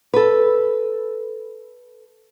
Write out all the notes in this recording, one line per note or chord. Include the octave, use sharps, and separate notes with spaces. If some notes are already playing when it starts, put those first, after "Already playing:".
A4 B4